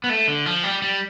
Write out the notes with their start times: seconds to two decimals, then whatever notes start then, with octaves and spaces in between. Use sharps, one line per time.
0.04 B3
0.09 A3
0.28 D3
0.46 F3
0.63 G3
0.82 G3